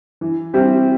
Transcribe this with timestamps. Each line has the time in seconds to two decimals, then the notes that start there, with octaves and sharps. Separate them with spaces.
0.21 E3
0.54 G3 C4 E4 G4